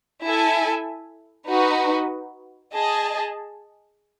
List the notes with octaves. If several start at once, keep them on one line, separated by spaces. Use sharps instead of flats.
E4 A4 E5 G#5
D#4 F#4 B4
G#4 D#5 A5